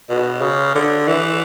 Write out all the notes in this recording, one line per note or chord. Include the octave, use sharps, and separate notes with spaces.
B2
C#3
D3
E3